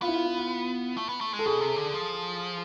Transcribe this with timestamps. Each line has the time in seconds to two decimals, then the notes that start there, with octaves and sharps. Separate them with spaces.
0.02 B3 F4
0.08 E4
0.13 F4
0.26 E4
0.38 F4
0.98 A3
1.09 B3
1.21 A3
1.33 G#3
1.39 A4
1.46 B2 G#4
1.61 C3
1.78 D3
1.94 F3